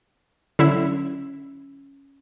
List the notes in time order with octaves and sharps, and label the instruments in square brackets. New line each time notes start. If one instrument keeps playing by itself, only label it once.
[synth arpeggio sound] D3 F#3 E4 [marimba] C#4